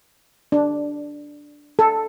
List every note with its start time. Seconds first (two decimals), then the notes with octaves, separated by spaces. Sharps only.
0.52 D4
1.79 A4